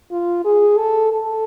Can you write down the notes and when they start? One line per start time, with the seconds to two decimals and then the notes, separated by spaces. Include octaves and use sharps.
0.11 F4
0.45 G#4
0.78 A4
1.12 A4